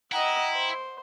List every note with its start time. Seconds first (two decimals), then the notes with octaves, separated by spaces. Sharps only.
0.12 E4 D#5 F#5 G5 A#5
0.53 C5